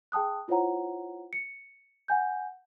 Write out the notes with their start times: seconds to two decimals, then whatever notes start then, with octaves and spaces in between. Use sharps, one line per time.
0.12 G#4 G5 A5 D#6 F#6
0.48 E4 F4 C5 C#5 F#5 A#5
1.33 C#7
2.08 F#5 G#5 G6